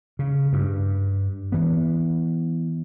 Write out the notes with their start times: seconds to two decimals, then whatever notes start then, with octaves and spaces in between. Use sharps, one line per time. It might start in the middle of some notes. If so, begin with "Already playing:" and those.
0.19 C#3
0.53 G2
1.52 E3 B3